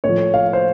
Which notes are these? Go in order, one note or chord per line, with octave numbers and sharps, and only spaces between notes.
A2 F3 C#5
F5
C5